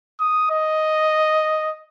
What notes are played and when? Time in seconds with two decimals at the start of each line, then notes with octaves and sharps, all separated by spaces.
0.20 D#6
0.50 D#5